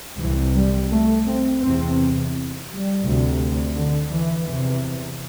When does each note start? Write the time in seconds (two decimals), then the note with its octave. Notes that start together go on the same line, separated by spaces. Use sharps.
0.19 C2 C3 E3
0.55 G3
0.91 A3
1.26 C4
1.61 E2 C3 C4
2.69 G3
3.04 D2 C3
3.75 D3
4.11 E3
4.46 E2 C3 E3